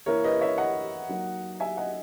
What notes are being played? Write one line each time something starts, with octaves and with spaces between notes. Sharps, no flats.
E3 A#3 E4 A#4 C#5
B4 D#5
C#5 E5
D#5 F#5
F#3 A#3 D#4
E5 G#5
D#5 F#5